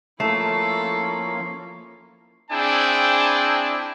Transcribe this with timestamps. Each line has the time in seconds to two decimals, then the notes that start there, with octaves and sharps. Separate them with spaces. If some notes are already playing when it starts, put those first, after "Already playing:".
0.20 F3 A3 A#3 C#4 E4 A4 C7
2.51 C4 D4 E4 G#4 G5 A5